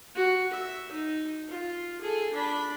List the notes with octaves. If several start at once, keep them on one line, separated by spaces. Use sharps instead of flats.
F#4
E5
D#4
F4
G#4 A4
D4 B5